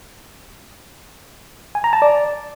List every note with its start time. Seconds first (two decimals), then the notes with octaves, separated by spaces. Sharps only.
1.75 G#5
1.84 A#5
1.93 A5
2.02 D5